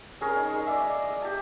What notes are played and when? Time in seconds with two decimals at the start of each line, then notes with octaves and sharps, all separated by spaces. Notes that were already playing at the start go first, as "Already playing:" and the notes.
0.21 C#4 G#4 A#4 C#5
0.36 D#4
0.52 G#3
0.67 D5 E5
1.03 D#5
1.22 G4 A5